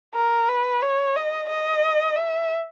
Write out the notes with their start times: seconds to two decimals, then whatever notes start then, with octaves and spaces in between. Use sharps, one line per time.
0.14 A#4
0.49 B4
0.82 C#5
1.16 D#5
1.49 D#5
2.16 E5